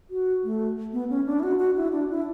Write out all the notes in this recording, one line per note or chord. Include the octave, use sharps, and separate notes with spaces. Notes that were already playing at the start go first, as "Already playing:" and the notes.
F#4
A3
B3
C#4
D4
E4
F#4
F#4
E4
D4
E4